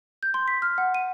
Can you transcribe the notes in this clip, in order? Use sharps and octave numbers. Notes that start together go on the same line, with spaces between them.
G6
C6
B6
F6
F#5
D#7